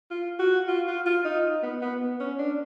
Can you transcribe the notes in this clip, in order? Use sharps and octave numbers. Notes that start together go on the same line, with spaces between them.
F4
F#4
F4
F4
F4
D#4
B3
B3
C#4
D4